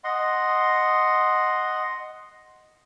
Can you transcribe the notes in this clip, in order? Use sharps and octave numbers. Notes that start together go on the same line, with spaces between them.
D#5 F#5 C6